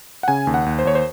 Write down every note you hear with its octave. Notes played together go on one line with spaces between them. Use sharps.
F#5
C#3 G#5
D#2
F#5
D#2
C5
D#2 C#5
C5